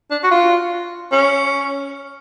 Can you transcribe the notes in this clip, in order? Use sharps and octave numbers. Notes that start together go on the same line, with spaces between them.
D4
F#4
F4
C#4